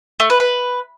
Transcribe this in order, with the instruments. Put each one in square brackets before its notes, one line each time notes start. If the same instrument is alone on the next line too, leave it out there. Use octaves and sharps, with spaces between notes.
[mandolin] A3
B4
B4